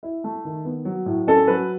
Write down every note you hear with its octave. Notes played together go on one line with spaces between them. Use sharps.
E4
A3
D#3
B3
F#3
A2
C#4 A4
F#3 B4